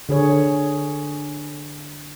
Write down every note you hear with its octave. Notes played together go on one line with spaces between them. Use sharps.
D3 G#4 C#5